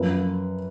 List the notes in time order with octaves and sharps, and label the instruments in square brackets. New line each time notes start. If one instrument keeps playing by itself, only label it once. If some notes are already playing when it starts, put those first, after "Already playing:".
Already playing: [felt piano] F#2 F3 B4